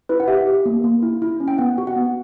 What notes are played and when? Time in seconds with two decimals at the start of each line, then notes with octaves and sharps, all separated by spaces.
0.09 E4 B4
0.20 F#5
0.27 G4 E5
0.47 G4
0.66 A#3
0.84 A#3
1.02 E4
1.22 E4
1.40 C#4
1.48 G5
1.58 B3 F#5
1.78 F#4
1.87 F#5
1.96 B3